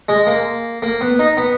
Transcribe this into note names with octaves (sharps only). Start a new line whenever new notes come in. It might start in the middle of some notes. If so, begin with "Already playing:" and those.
G#3
A#3
A#3
B3
D#4
B3